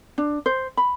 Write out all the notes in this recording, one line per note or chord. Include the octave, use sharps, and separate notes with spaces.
D4
C5
B5